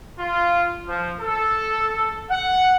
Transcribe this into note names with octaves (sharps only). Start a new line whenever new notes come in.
F4
F3
A4
F#5